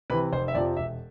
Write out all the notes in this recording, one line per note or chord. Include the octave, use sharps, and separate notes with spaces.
C3 E3 B4
F1 C5
E5
F2 C3 F3 D5
E1 E5